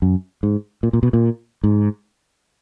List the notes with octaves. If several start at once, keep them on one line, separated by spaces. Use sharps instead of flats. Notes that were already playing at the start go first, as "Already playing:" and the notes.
F#2
G#2
A#2
A#2
B2
A#2
G#2